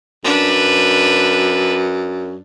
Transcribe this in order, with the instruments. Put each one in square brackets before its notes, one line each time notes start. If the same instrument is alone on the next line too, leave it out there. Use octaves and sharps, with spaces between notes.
[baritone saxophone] F#2 [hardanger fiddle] D4 B4